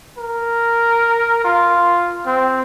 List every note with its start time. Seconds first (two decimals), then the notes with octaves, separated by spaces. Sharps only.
0.18 A#4
1.44 F4
2.26 C4